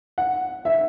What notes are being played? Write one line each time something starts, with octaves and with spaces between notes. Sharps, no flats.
F#5
E5